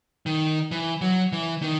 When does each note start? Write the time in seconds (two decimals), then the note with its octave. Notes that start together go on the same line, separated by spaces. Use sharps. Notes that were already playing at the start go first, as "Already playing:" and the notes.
0.26 D#3
0.71 E3
1.01 F#3
1.32 E3
1.62 D#3